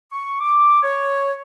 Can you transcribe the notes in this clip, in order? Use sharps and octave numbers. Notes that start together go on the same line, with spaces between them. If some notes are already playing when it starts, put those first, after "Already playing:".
C#6
D6
C#5